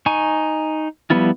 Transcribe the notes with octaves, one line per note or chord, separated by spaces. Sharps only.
D#4 G#5 C#6
F3 G3 B3 E4 F4